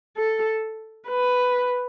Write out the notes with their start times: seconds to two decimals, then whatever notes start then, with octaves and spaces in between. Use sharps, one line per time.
0.17 A4
1.08 B4